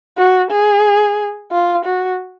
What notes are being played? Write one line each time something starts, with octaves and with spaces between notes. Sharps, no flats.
F#4
G#4
F4
F#4